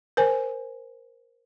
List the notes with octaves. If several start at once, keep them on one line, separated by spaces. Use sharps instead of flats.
A#4 C5 G#5